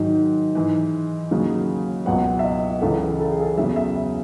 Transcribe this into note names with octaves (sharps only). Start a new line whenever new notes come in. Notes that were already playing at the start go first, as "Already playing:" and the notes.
Already playing: G#2 D#3 F#3
G#2 E3
D#2 C#3 F#3
C#2 B2 F#3 F#5
E5
D#5
C#2 C#3 E3 A4
A4
G#4
A4
E2 C#3 F#3 E5
E5
E5